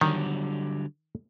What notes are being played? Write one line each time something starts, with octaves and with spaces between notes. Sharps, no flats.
D3 D#3 F#3 G3